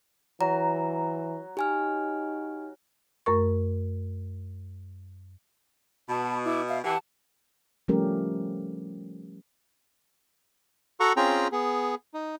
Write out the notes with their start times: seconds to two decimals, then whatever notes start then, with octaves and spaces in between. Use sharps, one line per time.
0.41 E3 F#3 A#5
1.57 D#4 G4 G#5 F6
3.26 F#2 A3 A#4 C#6
6.09 B2 A5 B5
6.44 E4 D6
6.69 E5 F5
6.84 E3 G4 F#5 A5
7.88 F3 G3 A3 C#4 G4 A#4
11.00 F#4 A4 F#5 A#5 C#6
11.17 C4 C#4 F4 G#4 G5 A#5
11.52 B3 G#4
12.14 D#4